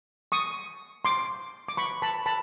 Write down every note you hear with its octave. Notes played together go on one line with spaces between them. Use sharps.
C#6 D#6
C6 D6
D6
B5 C#6
A5 B5
A5 B5